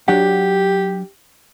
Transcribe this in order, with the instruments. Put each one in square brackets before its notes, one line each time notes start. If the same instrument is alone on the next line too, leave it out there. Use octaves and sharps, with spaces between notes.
[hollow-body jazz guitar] F#3 D4 F#5 [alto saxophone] G4